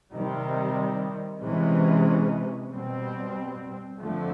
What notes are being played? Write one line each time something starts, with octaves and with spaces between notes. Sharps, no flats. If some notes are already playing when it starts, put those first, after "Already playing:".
C3 D#3 G3
C3 E3 G#3 C#4
B2 G3 C4
F2 D3 F3 A3